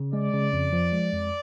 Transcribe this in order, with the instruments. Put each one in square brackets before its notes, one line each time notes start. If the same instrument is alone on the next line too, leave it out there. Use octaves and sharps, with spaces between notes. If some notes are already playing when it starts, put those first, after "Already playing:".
Already playing: [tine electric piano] C#3
[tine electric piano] G#3 [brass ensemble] D5
[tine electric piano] C#3
F2
F3
G#3
F2